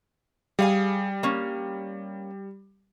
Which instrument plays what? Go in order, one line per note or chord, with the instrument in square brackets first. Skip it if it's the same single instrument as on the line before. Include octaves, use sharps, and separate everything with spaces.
[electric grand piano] G3 [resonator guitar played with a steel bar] G#4 F5 G#5
[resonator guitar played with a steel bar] A#3 C#4